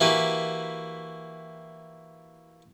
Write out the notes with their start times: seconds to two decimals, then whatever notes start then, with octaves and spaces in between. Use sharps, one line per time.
0.01 E3 A#3 F#4 G4 B4